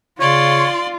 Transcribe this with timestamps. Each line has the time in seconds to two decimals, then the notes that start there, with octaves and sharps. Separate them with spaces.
0.20 C#3 F4 C#5 D5 C6